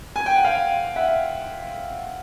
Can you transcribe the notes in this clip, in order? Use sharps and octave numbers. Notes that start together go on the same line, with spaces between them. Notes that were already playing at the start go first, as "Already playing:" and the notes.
G#5
G5
F#5
F5 G5
E5 F#5